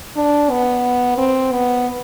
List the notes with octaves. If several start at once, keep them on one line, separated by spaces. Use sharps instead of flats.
D4
B3
C4
B3